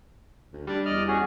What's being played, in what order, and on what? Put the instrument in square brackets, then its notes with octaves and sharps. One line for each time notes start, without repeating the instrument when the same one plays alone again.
[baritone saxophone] D2
[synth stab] G3 [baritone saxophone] D4
[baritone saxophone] E2 [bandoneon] D5 D#5 F6
[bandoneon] C#4 F#4 G#4